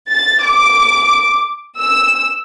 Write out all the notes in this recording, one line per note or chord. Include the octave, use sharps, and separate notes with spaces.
A6
D6
E6